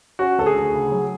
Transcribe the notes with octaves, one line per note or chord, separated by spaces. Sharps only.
C#4 F#4
D2 A4
G#4
D2
C#3
F#3